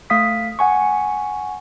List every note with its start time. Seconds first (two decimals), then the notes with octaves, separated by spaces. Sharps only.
0.10 A3 F5 D#6 B6
0.59 F#5 G#5 C#6